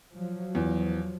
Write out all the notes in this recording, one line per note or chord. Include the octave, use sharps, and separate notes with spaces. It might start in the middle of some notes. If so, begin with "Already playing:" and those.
F3 F#3
E2